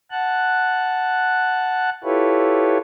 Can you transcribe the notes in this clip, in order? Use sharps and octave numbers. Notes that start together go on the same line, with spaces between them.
F#5 A5 F#6
E4 F4 G4 A4 B4 C#5